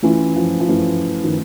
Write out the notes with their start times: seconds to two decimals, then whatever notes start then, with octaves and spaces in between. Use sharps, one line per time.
0.03 E3 A3 C#4 F4
0.36 F3
0.60 F3
0.68 E3 A3 C#4 F4
1.24 D#3